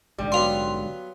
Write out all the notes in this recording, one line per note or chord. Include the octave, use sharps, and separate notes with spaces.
A#1 G#2 D3 G3
F#3 B3 F5 C6